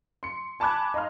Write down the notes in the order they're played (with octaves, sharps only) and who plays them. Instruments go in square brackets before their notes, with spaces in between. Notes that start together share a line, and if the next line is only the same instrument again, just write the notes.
[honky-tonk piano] C6 C#7
G#5 A5 B5 D6 F#6 G#6
D#5 F5 A#5 C6 F6